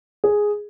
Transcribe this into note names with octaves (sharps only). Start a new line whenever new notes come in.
G#4